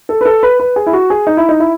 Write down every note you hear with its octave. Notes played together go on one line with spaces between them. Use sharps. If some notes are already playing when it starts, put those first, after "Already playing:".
A4
B4
A4
B4
B4
G#4
E4
F#4
G#4
D#4
E4
D#4
E4